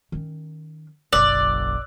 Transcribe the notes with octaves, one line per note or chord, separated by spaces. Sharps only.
D#3 C#4
F#1 B1 D5 D6 E6 F#6